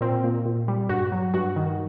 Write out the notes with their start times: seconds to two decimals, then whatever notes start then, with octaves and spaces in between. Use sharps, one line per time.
0.01 A#2 C4
0.24 A#2
0.45 A#2
0.68 G3
0.89 G2 F#4
1.12 F#3
1.34 G2 F#4
1.56 D#3